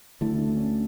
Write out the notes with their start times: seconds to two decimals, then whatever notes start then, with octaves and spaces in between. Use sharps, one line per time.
0.21 D2 D3 A3 E4
0.38 D4
0.56 C#4